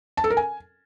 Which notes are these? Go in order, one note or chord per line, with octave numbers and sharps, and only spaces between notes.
A5
A4
A#4
G#5